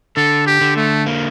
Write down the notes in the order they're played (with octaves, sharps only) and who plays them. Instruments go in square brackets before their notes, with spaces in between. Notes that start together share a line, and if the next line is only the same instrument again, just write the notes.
[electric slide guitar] D3 [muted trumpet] A4
[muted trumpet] G4
[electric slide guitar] D3
[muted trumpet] A3
[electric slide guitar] A#3